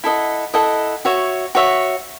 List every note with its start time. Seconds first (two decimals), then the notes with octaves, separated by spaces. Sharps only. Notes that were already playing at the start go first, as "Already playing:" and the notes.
0.04 E4 A4 D#5 F#5
0.54 E4 A4 D#5 F#5
1.05 F#4 C#5 E5
1.55 F#4 C#5 E5